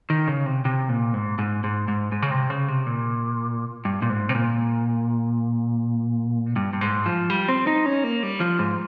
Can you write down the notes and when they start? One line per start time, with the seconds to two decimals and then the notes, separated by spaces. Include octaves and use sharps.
0.10 D#3
0.28 C#3
0.46 C3
0.65 C3
0.89 A#2
1.14 G#2
1.39 G#2
1.64 G#2
1.88 G#2
2.12 G#2
2.22 C#3
2.31 C3
2.50 C#3
2.68 C3
2.86 A#2
3.85 G2
4.02 A#2
4.10 G#2
4.29 C3
4.35 A#2
6.56 G2
6.73 G2
6.81 G#2
7.06 F3
7.30 G3
7.48 C4
7.67 D#4
7.86 C#4
8.04 A#3
8.23 G3
8.40 F3
8.59 G#2